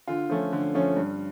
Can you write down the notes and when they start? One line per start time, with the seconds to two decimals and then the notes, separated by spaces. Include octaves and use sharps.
0.08 D3 F4
0.30 F3 A3 C#4
0.52 D3
0.74 F3 A3 C#4
0.97 G2